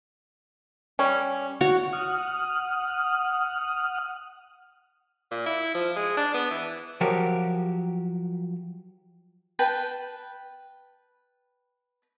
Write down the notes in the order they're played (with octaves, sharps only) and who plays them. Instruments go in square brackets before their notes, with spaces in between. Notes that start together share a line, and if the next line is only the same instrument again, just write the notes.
[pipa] G3 C#4
[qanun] F#4 C#5
[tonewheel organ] F#5 D#6 F6
[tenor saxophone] A#2
E4
F3
G#3
D4
B3
E3
[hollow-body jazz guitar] F3 F#3 F#4 G4 A#4
[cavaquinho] B4 G5 A5